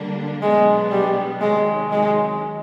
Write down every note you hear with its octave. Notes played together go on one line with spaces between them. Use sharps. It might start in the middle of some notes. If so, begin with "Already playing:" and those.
Already playing: D3 G3 A#3 D4
B2 F#3 G#3 B3 D4
G3
C3 D#3 F#3 G#3
G#3